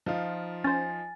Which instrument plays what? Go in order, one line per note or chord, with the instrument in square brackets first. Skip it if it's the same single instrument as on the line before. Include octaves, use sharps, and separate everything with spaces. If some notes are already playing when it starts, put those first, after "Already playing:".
[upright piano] F3 D#4 F4
[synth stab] C#4 C5 [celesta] G#5 A6